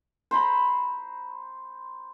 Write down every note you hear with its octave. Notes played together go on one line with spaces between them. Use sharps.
C5 A#5 B5